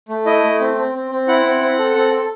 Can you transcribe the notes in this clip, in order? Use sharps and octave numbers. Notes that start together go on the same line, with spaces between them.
A3
E4 D#5
A3
C4
C4
C4
C4
E4 F#5
C4
C4
A4
C4
A4